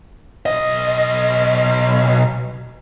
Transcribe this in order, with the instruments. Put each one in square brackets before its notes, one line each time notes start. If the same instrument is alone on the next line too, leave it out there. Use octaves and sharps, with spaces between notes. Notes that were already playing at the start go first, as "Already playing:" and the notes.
[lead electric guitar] B1 D#5